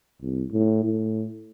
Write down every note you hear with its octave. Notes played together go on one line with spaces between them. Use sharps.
C2
A2
A2